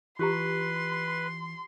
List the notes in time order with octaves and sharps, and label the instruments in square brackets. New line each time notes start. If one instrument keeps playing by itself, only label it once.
[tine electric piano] E3 [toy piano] F4 G4 A#5 [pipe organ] B4 [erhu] C6